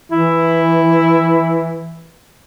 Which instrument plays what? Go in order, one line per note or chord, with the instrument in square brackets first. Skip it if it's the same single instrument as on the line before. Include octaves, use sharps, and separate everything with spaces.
[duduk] E3 [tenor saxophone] E4